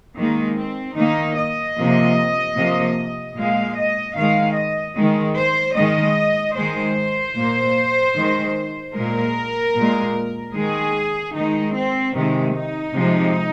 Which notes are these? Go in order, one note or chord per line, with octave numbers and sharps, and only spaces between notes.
D#3 G#3 A#3
C4
D#3 A#3 D#4
D#5
C3 F3 A#3
C3 F3 A#3
A#2 G#3 F5
D#5
D#3 G#3 F5
D#5
D#3 G#3
C5
D#3 G#3 D#5
D#3 G#3 C5
A#2 A#3
D#3 G#3
A#2 G#3 A#4
A#2 G#3
D#3 G#3 G#4
D#3 G#3 D#4
C4
C3 D#3 G#3
D#4
C3 F3 G#3